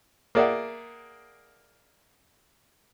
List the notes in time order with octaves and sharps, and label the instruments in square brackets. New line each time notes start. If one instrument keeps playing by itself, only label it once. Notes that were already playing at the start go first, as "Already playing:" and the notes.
[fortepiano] A#3 G#4 D5 E5 F#5